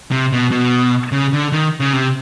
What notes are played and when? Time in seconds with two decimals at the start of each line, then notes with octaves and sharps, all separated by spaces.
0.11 C3
0.32 B2
0.51 B2
1.12 C#3
1.33 D3
1.52 D#3
1.80 C#3
1.93 C3